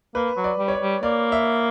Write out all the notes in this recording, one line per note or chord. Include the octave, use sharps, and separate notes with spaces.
A#3 B4
F#3
D5
G3
C#5
D5
G3
A#3 D5
E5